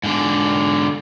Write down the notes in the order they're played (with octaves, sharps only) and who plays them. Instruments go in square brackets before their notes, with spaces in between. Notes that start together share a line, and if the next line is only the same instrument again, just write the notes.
[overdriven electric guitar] G#2 D3